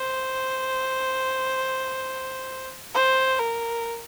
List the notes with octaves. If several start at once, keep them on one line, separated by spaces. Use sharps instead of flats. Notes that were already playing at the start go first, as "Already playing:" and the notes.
Already playing: C5
C5
A#4